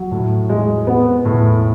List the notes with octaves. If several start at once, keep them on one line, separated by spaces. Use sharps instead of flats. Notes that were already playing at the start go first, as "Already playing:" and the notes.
Already playing: F#3
A2
G#3
B3
A2